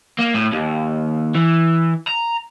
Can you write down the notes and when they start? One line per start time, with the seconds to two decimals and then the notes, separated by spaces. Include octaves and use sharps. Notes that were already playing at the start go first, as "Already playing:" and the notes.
0.18 A#3
0.34 A2
0.53 D#2
1.35 E3
2.08 A#5